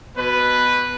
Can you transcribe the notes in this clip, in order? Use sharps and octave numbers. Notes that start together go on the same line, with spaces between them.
B2 B4